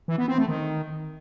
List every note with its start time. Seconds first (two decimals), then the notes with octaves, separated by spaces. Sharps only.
0.08 E3
0.18 B3
0.28 C4
0.38 A3
0.48 D#3